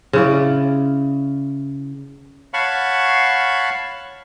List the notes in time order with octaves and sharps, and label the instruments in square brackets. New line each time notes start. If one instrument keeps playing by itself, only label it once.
[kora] C#3 E4 D5
[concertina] C#5 F5 F#5 A5 B5 C#6